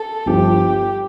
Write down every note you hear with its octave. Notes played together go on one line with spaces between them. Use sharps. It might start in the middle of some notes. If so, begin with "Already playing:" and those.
Already playing: A4
G1 G2 F3 G4